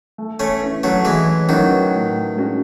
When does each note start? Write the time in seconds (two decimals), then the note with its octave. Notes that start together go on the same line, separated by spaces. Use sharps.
0.18 A3
0.40 A3 C#4
0.62 C#4 E4 B4
0.83 F#3 A3
1.05 E3 G#3 A3
1.49 D#3 F#3 C#4 E4 B4
1.93 A2
2.37 G#3 C#4 F#4